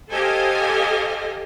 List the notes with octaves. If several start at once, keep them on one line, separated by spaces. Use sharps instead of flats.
G4 A4 C5 D#5 F5 G#5